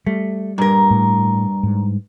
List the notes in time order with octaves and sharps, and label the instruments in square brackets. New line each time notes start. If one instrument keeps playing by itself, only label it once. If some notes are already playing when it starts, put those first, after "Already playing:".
[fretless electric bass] G3 [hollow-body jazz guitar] A3
[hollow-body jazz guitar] G2 [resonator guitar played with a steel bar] A#2 A#4
[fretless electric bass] A2
G#2